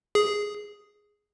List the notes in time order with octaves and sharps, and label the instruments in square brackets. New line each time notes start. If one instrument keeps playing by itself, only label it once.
[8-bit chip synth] G#4